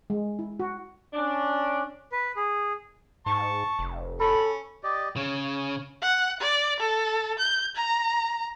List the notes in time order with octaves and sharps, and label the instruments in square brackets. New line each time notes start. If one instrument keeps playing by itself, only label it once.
[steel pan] G#3
E4
F#4
[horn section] C#4 D4
[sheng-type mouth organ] B4
G#4
[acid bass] G#2 [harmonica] A5 C#6
[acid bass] F1
[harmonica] C#4 [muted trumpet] A4 [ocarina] B5
[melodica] G4 D5 D#5
[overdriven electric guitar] C#3 [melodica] C#5
[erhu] F#5
D5
A4
G6
A#5